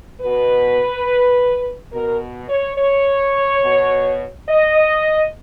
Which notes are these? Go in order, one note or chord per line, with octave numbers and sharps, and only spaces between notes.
B2 B4
B2 A#4
C#5
C#5
B2
D#5